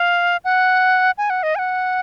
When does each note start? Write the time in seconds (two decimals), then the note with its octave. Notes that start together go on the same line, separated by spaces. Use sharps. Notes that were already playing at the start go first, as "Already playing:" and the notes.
Already playing: F5
0.45 F#5
1.18 G#5
1.30 F#5
1.43 D#5
1.55 G#5
1.59 F#5